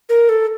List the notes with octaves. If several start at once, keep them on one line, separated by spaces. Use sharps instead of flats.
A#4
A4